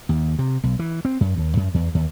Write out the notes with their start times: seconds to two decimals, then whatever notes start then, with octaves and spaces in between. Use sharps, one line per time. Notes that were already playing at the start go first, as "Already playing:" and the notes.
0.09 D#2
0.39 C3
0.63 B1
0.79 E3
1.05 C4
1.21 F#2
1.37 D#2
1.57 F#2
1.74 E2
1.95 D#2